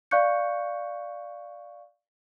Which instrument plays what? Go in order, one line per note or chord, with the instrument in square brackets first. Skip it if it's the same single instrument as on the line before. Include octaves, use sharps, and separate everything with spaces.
[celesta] D5 F5 C#6 F#6 G6 C#7